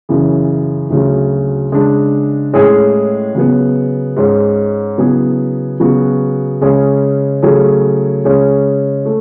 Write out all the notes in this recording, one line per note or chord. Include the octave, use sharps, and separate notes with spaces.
F#2 C#3 E3
D2 C#3 F#3
C#3 G#3 D4
A2 G#3 C#4 E4 G#4
C#3 F#3 B3
G#2 G#3 C#4
C#3 F#3 B3 E4 G#4
C#3 F#3 B3 F#4
C#3 G#3 C#4 G#4
C#3 F#3 A3 C#4 G#4
C#3 G#3 C#4
A3